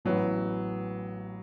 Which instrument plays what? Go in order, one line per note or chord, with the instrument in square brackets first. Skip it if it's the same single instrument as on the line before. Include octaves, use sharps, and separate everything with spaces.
[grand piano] A1 A2 E3 B3 [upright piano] F#3